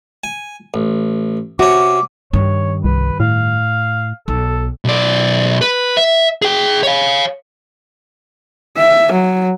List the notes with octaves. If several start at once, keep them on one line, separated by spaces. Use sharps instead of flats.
G#5
A1
C3 C#4 F#4 D6
G2 D#3 C#5
C2 B4
A2 F5
B1 A4
B1 D5
B4
E5
G#4 G5
C#5 F5
E5
F#3